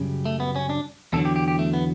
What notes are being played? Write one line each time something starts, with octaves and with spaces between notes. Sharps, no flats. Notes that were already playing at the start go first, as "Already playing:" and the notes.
Already playing: F#2 C#3 G3
A3
B3
C#4
D4
E2 D3 F#3 A4
G4
G4
G4
A3
B3